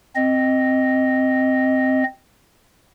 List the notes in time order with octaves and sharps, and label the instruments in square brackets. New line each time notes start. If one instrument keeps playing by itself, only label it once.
[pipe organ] C4 D#5